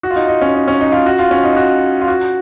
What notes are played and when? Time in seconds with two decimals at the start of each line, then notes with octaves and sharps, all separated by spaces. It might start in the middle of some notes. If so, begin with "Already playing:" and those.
0.03 F#4
0.11 F4
0.16 D#4
0.28 D#4
0.41 C#4
0.55 D#4
0.68 C#4
0.80 D#4
0.92 F4
1.06 F#4
1.19 F4
1.31 C#4
1.44 D#4
1.57 F#4
2.01 F4
2.08 F#4